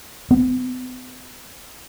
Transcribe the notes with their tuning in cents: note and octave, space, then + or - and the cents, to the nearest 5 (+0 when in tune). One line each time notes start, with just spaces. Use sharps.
B3 +45